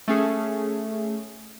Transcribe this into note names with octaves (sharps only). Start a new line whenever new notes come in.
A3 C#4 G#4